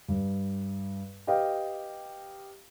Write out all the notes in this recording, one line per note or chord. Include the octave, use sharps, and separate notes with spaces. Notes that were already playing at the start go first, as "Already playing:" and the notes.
G2
G4 B4 D#5 F5 G5